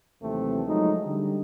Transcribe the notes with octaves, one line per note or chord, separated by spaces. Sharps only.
D#2 C3 E3 F#3 A3 C4
F3 F#3 G#3 A3 D#4
D3 G3